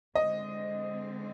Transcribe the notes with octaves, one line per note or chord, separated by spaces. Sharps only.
D3 G#3 C4 D#5